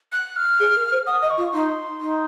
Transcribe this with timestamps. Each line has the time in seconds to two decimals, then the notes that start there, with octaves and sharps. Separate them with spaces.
0.12 F#6
0.36 F6
0.60 G#4
0.76 A#4
0.92 C5
1.07 F#5 D#6
1.22 D#5
1.30 C#6
1.38 F4
1.53 D#4 C6
2.00 D#4